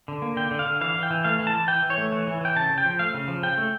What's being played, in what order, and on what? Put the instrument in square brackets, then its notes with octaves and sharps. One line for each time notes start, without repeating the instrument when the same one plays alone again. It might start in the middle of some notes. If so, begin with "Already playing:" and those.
[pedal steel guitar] D3
A#3
D3 G5
D3
F5
D3
E3 F5
E3
G5
E3
A3 F5
E3
A5
E3
E3 G5
E3
C#5
A3
E3
E3
E3 G5
C#3 A5
C#3
G5
F3
A3 F5
C#3
F3
C#3 G5
A3